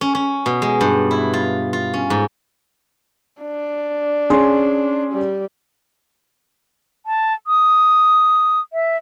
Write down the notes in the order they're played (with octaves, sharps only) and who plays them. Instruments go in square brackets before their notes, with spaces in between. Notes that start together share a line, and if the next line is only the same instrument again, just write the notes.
[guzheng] C#4
C#4
B2
G#3
G2
E4
F4
F4
C#4
G#2
[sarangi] D4
[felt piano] C#4 G#4 C6
[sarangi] G3
[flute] A5
D#6
E5